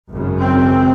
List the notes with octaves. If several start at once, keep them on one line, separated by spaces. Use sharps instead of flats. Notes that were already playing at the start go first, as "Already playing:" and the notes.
G#1 F#2 C#3
C4